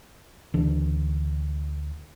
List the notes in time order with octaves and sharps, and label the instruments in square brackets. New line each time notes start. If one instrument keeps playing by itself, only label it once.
[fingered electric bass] D2 C#3 E3 D4